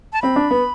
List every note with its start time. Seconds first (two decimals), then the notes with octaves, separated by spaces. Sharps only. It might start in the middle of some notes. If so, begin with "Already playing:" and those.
0.13 A5
0.22 C4 B5
0.36 D4
0.51 B3